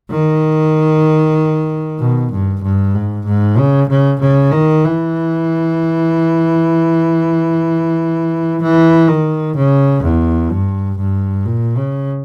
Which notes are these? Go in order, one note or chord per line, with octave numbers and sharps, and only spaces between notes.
D#3
B2
G2
G2
G#2
G#2
C#3
C#3
C#3
D#3
E3
E3
D#3
C#3
E2
G2
G2
A#2
C#3